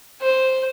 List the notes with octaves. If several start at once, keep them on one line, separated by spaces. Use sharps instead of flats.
C5